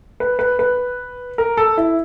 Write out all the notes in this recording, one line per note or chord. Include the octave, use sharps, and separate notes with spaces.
B4
B4
B4
A#4
A4
E4